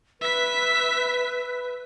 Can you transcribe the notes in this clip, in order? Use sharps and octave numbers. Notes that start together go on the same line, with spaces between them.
B4 E5 B6